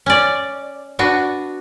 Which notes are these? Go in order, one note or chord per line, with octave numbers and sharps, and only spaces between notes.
C#4 D5
B3 D4 F#4